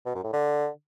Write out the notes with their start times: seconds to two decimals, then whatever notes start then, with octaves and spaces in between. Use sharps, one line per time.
0.06 B2
0.15 F#2
0.24 A2
0.33 D3